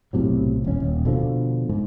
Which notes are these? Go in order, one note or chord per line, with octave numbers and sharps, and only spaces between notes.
B1 A2 C3 F#3
D#1 C#4
D#1
B2 D3 F3
G#2